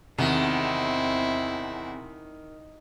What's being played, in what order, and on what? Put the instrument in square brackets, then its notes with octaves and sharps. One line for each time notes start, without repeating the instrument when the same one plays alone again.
[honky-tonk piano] E2 [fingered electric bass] C3 [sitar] D#3 [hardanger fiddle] C4 E4